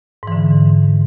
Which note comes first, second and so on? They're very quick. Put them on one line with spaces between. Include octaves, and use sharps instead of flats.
G#2 E3 D3